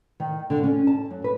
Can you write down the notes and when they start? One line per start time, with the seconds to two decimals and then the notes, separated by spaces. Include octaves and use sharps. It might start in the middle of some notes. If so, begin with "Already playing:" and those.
0.20 D#3
0.50 D3
0.64 C#4
0.87 A5
1.10 F#2
1.24 B4